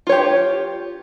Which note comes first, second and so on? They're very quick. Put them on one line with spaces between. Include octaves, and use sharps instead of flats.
F4 C#5 G4